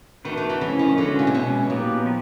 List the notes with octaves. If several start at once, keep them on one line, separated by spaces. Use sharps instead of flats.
D#3 A3 D4 F#4 B4
D#3
E3
C#3 E3 F3 A3 C#4
D#3
D3 G#3 C#4 F#4 B4
C#3
C3
B2 E3 G#3 C#4
A#2 F#3 B3 D#4 G4 B4
F3